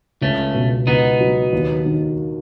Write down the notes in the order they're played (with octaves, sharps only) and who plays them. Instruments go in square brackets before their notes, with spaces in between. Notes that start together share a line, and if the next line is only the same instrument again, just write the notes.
[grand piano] C#2 [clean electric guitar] A3 C#4
[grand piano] B2
[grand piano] C#2 [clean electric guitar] B3 D#4
[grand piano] F#3
D#2
D#3